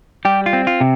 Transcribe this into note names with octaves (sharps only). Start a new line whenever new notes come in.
G3 G4
F4
C4
F4
C3